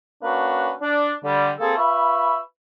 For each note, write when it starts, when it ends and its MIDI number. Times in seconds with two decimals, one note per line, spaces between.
0.23 0.72 58
0.23 0.72 61
0.23 0.72 62
0.23 0.72 66
0.23 0.72 71
0.82 1.12 62
1.24 1.51 50
1.24 1.51 55
1.59 1.77 58
1.59 1.77 60
1.59 1.77 68
1.59 1.77 69
1.77 2.38 65
1.77 2.38 71
1.77 2.38 76
1.77 2.38 83
1.77 2.38 85